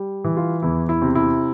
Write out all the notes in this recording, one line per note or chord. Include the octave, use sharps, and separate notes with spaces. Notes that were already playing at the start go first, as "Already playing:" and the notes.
Already playing: G3
E3
F4
E2 E4
E4
C3
E4